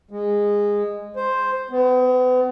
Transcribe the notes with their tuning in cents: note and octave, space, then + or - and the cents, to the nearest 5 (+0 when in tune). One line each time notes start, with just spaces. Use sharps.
G#3 -15
C5 +0
B3 +40